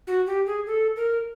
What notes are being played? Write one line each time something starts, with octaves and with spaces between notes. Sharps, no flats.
F#4
G4
G#4
A4
A#4